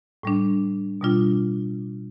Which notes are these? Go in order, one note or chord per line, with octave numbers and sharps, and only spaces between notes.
A2 G3 D4
B2 G3 D4 F4